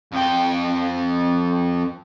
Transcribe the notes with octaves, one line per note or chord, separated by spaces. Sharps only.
F2 G5